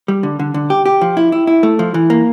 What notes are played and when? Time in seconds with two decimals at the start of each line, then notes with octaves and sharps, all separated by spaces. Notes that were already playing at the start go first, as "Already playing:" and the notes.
0.08 G3
0.23 D3
0.39 D3
0.54 D3
0.70 G4
0.86 G4
1.01 F3
1.17 E4
1.32 E4
1.47 E4
1.63 A3
1.79 F3
1.94 E3
2.10 A#3